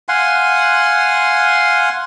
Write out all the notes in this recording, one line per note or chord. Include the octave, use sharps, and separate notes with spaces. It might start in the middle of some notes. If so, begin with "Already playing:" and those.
F5 F#5 G#5 C6